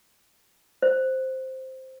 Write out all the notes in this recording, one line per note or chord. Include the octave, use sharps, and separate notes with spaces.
C5